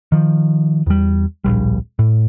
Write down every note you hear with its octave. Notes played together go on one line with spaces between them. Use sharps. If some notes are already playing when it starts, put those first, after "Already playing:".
D#3 F3
E2 G3
D1 A#1 G3
A2